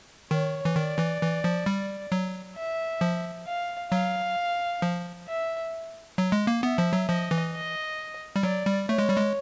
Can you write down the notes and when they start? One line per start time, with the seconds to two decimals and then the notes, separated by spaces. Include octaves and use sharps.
0.31 D#3 C#5
0.65 E3
0.75 D#3 D5
0.99 E3
1.22 E3
1.44 F3
1.66 G3
2.12 F#3
2.56 E5
3.01 F3
3.47 F5
3.91 F#3 F5
4.82 F3
5.27 E5
6.18 F#3
6.32 G#3
6.47 A#3
6.63 B3 E5
6.78 F3
6.93 F#3
7.08 F3 D#5
7.31 E3
7.53 D#5
8.36 G3
8.43 F#3 D5
8.66 G3
8.89 A3 C#5
8.98 G#3
9.08 G3
9.17 G#3